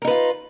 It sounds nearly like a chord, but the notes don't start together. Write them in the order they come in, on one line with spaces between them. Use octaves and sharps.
A#4 D#4 B4 F4